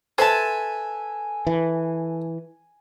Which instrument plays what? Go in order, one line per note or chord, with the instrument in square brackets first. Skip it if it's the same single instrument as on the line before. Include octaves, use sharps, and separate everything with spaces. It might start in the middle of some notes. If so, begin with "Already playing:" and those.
[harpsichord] A4 B4 E5 [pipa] C5 A5 [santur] G#5
[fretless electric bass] E3